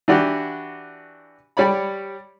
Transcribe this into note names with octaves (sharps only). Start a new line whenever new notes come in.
E3 D4 F#4 G4
G3 C#5 D5 B5